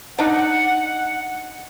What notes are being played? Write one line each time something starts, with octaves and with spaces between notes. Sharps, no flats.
D4 D#4 F#5